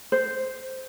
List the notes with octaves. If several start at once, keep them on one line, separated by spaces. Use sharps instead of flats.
C5